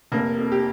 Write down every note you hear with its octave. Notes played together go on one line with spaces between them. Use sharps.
F1 A#3 A#4
F2
G4